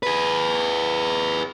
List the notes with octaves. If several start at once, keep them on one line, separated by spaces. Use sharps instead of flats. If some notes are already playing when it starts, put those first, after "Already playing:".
G#4 B4